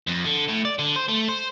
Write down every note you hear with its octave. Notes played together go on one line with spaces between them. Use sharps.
F2
D3
A2
D5
D3
C5
A3
C5